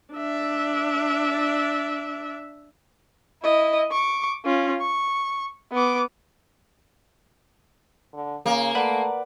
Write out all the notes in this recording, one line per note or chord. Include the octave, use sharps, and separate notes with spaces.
D4 E5
E4 D#5
C#6 D6
C#4 F4
C#6
B3 D6
D3
C#3 A#3
A3 B4 D5 F#5